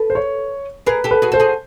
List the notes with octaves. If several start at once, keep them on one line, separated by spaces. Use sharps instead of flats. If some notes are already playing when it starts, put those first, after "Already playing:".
Already playing: A4 B4
C5
C#5
G#4 A#4 B4
G4 A4
B4
F#4 G#4
A4 C5
F#4 G#4